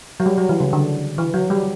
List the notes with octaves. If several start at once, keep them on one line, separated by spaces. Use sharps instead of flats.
F#3
G3
F#3
E3
C#3
D3
E3
F#3
G3